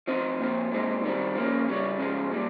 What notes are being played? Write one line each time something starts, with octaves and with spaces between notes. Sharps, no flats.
F3 C4 D#4
A#2 F3 C4
A#2 G#3 C4 D#4
D#3 G3 C4
F3 A#3 C#4
C#3 G3 C#4
C#3 F3 G#3
A#2 G3